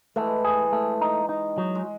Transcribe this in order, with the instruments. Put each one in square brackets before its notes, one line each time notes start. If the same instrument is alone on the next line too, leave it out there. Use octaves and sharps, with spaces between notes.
[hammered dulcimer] E3 G#3 [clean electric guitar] A3
[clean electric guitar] G#4
A3
D#4
D#4
F#3
[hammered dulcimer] G#3